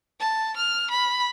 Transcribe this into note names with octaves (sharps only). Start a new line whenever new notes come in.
A5
F6
B5